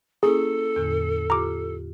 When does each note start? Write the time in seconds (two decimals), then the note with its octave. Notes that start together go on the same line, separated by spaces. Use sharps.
0.23 A#3 C#4 E4 G#4 A4
0.76 E2 A2 D3
1.30 F4 G4 A#5 D6